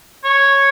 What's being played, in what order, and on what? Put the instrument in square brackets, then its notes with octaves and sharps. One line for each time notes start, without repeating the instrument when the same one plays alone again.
[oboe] C#5